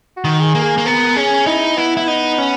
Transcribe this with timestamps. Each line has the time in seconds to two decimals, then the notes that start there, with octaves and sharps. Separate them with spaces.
0.16 F#4
0.24 D#3
0.40 G#4
0.55 A#3
0.62 G#4
0.78 A#3
0.86 B3 A#4
1.16 C#4 G#4
1.46 D#4 E4
1.77 B3 E4
1.97 E4
2.08 D#4
2.38 C#4